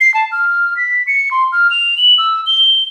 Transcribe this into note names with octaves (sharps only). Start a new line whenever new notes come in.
C7
A5
F6
B6
C#7
C6
F6
F7
F#7
E6
G7